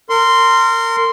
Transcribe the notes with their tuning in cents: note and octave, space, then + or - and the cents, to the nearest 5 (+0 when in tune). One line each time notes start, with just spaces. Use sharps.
A#4 -30 C6 -5